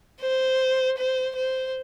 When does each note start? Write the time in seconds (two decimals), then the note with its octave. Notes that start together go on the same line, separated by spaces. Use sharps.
0.20 C5
0.98 C5
1.36 C5